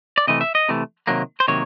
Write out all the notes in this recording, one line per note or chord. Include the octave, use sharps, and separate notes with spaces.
D5
C3 E3 A3 D#5
E5
D#5
C3 E3 A3
C3 D#3 F#3 A#3
C5
C3 D#3 F#3 A#3 C#5